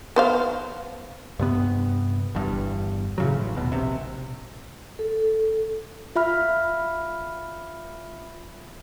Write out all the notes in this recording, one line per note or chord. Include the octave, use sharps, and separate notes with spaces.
B3 C5 F5
G2 C3 B3
G1 E2 G2
A2 C#3 F#3
A1
D#1 B2
A#1 C3
A4
F4 E5 B5 F6